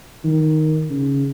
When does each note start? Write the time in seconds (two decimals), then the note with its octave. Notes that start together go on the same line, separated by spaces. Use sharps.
0.24 D#3
0.90 C#3